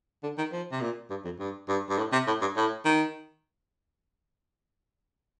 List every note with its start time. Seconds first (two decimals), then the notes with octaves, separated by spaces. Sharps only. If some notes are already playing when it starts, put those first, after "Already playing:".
0.23 D3
0.38 D#3
0.52 F3
0.72 C3
0.81 A#2
1.10 G2
1.25 F2
1.39 G2
1.68 G2
1.90 G2
1.98 A2
2.12 C3
2.27 A2
2.41 G2
2.57 A2
2.85 D#3